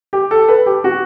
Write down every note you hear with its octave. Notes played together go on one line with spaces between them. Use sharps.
G4
A4
B4
G4
F#4